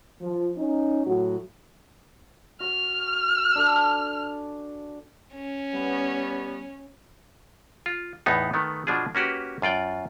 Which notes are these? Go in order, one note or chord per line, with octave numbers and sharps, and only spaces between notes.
F3
C#4 D#4
A2 F#3 F#4
F#4 C#5 F6
D4 A4 G#5
C#4
G3 B3
F4
E2 A2 B3 D#4
D#3 A3 B3
B2 F3 D4 F4 G#4
A#3 C#4 F#4 G4 B4
F#2 F4 D5 G5